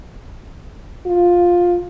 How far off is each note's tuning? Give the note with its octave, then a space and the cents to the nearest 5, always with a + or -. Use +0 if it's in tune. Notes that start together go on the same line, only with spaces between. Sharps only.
F4 +10